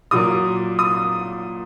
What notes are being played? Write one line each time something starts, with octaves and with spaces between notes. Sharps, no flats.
A#2 F#3 A#3 D#6
D#6